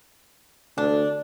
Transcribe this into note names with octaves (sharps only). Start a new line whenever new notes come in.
D2 D4